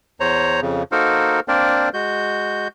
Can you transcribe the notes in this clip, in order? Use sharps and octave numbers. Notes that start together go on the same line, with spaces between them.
E2 C5 C#5 A#5
F2 C#3
A#3 D#4 F#4 A4 A#4 C5
A#3 C4 D4 A#4 C5 D5
G#3 F#4 G6